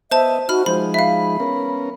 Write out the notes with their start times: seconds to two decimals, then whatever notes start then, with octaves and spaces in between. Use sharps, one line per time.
0.11 B3 C5 D#5 E5 A5
0.49 D#4 F#4 B5 F6
0.66 F3 G#3 D#4 C5 B5
0.94 E5 F5 B5
1.40 B3 C#4 A#4